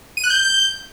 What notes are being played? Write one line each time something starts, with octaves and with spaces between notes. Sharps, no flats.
D#7
F#6
G6